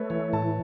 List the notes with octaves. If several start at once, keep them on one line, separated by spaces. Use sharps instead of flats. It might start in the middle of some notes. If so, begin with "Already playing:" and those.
Already playing: A3 B4 C#5
E3 C#5
A2 A5